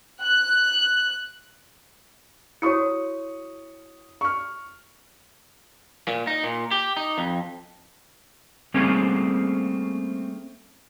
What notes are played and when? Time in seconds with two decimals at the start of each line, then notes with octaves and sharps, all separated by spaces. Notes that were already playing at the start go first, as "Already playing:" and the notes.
0.22 F#6
2.62 E4 F#4 C#5 C#6 D#6 C#7
4.21 C#6 F6
6.08 A#2
6.27 D#4
6.43 A#2
6.71 G4
6.97 D#4
7.18 F2
8.74 G3 A3 A#3 C4 C#4 G#4